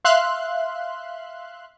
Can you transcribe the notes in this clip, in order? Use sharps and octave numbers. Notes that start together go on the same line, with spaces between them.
E5 F5 C6 F#6